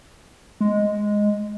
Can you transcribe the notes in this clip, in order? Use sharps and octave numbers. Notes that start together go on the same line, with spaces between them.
G#3